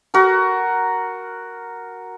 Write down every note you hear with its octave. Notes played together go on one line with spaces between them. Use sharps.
F#4 A#4